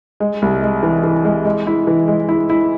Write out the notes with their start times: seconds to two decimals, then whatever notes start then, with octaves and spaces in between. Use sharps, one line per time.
0.20 G#3
0.42 C2
0.62 G#3
0.83 E3
1.03 E3
1.25 G#3
1.45 G#3
1.67 E4
1.87 E3
2.08 G#3
2.29 E4
2.50 E4